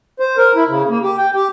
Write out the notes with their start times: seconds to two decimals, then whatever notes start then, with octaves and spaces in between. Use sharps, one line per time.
0.20 C5
0.37 A#4
0.55 E4
0.69 C#3
0.89 A#3
1.02 G4
1.18 G5
1.35 G4